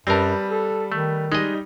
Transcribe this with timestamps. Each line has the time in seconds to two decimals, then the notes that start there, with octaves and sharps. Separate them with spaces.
0.07 F#2 G3 C4 A#4 B4 A5
0.51 A4
0.92 D#3 A3
1.32 G3 G#3 D#4 D#5